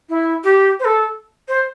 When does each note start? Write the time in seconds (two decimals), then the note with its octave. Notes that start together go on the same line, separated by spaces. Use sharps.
0.09 E4
0.44 G4
0.79 C5
0.84 A4
1.48 C5